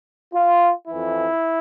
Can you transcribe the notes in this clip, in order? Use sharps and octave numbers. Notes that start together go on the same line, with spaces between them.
F4
F2 E3 E4